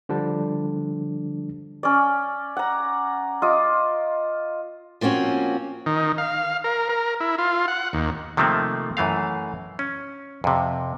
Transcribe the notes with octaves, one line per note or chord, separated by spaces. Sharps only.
D3 F3 G3 D4
C#4 D5
F#5 A#5
F4 D#5 D6
F3 A#3 C4 C#4 F#4
D#3
F5
A#4
A#4
E4
F4
F#5
D#2
C3 D#3 F3 A3 A#3 C4
F#2 E3 A3 F5
C#4
F2 C3